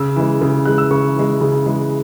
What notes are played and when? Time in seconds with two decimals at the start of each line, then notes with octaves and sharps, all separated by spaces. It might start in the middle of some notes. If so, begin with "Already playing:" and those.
Already playing: C#3 E6
0.16 E3 G#3
0.42 C#3
0.65 E3 G#3 F#6
0.78 E6
0.91 C#3 C#6
1.15 E3 G#3
1.41 C#3
1.66 E3 G#3